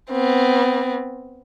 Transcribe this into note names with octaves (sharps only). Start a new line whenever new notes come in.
B3 C4